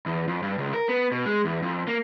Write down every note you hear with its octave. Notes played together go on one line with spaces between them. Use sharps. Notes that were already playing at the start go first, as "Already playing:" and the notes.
E2
F2
G2
C#2
A#4
B3
B2
G#3
E2
F2
A#3